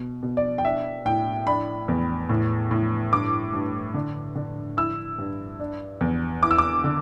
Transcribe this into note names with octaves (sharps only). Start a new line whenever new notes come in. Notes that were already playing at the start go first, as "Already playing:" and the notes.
Already playing: B2
B2
D5
G5
D4 E5
A2 G5
D4 B5
E2
A2
A2
G2 D6
G2
D3
D3
E4 E6
G2
D4
E2
E4 D6
E6
D6
D3